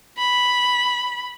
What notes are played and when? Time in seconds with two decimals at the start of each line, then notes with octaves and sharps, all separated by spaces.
0.18 B5